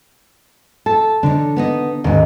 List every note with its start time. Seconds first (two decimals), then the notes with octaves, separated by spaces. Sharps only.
0.86 A4 A5
1.23 D3 D4 D#4 C#5
1.56 B3 D#4 D#5
2.04 D#1 G#2 D4